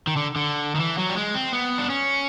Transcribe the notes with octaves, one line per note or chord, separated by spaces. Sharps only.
D#3
D3
D3
D#3
E3
F#3
G3
G#3
C4
B3
D4
C#4